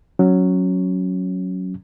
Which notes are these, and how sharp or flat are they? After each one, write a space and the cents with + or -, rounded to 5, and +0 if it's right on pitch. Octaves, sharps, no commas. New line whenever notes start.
F#3 +0 C#4 +0